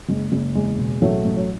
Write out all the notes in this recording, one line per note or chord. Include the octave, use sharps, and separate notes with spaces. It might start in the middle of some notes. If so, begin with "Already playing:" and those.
F#1 G#3
F#1
E2 G#3
B2
A1 F#3 A3
A1
F#3